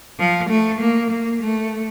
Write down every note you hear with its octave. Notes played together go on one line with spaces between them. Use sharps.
F3
A3
A#3
A#3
A3